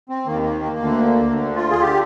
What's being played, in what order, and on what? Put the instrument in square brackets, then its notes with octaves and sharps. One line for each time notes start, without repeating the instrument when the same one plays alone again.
[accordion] C4
D#2 D#3 A#3
A#3
A#3
D2 D3
D2 D3
F4
G#4
D3 G4